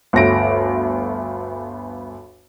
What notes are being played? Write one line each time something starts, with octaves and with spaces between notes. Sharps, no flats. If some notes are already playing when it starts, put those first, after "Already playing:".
G1 D2 A#6 D7